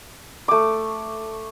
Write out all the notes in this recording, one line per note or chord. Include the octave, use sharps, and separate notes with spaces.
A3 D6